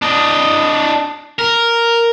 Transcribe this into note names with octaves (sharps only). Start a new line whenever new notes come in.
D4 D#5
A#4